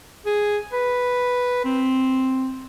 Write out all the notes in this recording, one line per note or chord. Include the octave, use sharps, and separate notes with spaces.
G#4
B4
C4